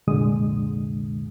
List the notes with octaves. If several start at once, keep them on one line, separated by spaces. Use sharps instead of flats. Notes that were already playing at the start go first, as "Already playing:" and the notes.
C2 F2 A#2 D3 G#3 D#6